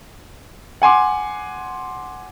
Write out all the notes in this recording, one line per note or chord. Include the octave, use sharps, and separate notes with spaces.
F#5 G#5 C6 D6